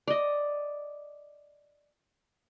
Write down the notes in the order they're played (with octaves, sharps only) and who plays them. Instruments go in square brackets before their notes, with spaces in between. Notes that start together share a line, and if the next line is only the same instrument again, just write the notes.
[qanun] D5 D#5